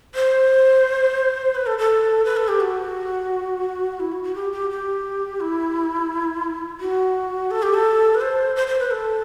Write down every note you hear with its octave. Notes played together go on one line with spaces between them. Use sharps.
C5
B4
A4
A4
B4
A4
G4
F#4
E4
F#4
F#4
G4
G4
G4
E4
F#4
A4
G4
A4
B4
C5
C5
C5
B4
A4